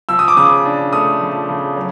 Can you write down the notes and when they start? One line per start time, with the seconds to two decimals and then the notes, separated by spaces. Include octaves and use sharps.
0.09 F3 E6
0.19 D#6
0.28 D6
0.37 C#3 D#6
0.65 D4
0.93 A3 D#6
1.21 F3
1.49 C#3
1.76 F#3